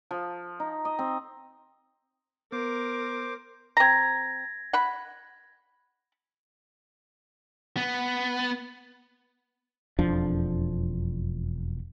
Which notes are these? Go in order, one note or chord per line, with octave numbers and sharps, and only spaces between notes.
F3
D#4
D#5
C4
B3 A#4 C5 D6
C4 A#5 G#6 A#6
F#5 B5
B3
E1 F2 F3 D4